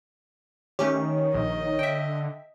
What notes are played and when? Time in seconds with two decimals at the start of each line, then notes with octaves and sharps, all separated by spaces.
0.79 D#3 A3 C#4 G4 C#5
1.34 A#1 D#5
1.79 D3 E5 G5